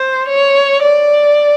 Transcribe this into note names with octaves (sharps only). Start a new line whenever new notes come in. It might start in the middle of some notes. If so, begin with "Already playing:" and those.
Already playing: C5
C#5
D5